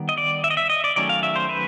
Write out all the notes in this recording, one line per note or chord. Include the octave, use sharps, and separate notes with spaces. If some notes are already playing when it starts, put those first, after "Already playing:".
Already playing: D#3 G3 B3
D#5
D5
E5
D#5
E5
D#5
D5
D#3 F#3 A3 C#4 D5
F5
E5
C5
B4